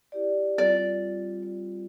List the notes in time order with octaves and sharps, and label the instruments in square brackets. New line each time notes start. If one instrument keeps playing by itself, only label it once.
[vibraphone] E4 G4 D5
[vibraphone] G3 C4 F4 [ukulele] D5